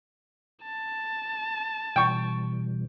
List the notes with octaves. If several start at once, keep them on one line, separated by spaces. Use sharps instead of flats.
A5
B2 E3 G3 G5 C#6